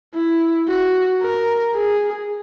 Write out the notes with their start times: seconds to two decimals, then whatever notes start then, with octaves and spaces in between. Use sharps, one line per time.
0.15 E4
0.68 F#4
1.21 A#4
1.74 G#4